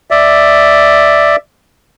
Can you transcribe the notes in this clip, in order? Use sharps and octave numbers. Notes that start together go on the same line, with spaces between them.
D5 E5